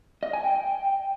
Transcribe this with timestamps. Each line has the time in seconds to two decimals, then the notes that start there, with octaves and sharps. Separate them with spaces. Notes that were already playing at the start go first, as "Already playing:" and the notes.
0.23 D#5
0.33 G#5
0.44 G5